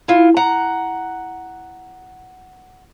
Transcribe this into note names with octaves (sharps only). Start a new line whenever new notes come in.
E4 F4
F#5 A#5